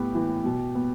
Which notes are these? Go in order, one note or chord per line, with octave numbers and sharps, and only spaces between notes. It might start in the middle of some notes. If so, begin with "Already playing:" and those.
Already playing: A2 B3 G4
E3
B2
B3